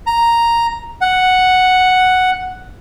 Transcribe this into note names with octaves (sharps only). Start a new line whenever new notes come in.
A#5
F#5